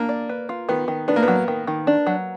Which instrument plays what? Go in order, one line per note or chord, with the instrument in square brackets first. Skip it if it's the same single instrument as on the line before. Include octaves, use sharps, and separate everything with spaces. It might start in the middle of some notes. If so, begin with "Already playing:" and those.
Already playing: [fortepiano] A#3 [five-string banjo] D4
[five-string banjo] D5
B4
F4
[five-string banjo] D#3 [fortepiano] B3
[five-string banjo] D#3
[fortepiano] B3 [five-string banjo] D4
[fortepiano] A#3
B3
[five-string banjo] F#3
D#3
D#3
D4
F#3